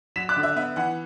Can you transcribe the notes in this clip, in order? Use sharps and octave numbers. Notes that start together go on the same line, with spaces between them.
F#3 B6 E7
D6 F#6
D3
E5
B3 E5
E3 F#5